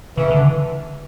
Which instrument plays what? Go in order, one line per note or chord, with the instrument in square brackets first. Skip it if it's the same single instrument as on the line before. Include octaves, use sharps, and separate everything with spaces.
[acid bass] C#3 [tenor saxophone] E3
[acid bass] D3